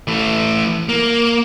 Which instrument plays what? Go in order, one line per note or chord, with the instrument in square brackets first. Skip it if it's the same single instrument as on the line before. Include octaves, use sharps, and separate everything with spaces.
[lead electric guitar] E3 A3
A#3